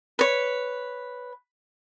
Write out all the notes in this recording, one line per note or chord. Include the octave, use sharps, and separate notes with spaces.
B4 C#5